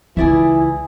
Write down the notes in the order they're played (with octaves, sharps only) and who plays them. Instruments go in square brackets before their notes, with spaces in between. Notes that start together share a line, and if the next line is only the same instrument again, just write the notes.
[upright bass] C#2 [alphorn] E3 [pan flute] E4 [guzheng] G#4 D5 E5